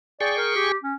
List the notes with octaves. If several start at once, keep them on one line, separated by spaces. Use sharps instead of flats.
G#4 D5 G5 C#6
A#4
G4
C#4